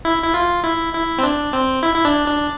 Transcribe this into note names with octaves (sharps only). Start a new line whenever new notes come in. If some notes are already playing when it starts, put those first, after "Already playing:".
E4
E4
F4
E4
E4
C4
D4
C4
E4
E4
D4
D4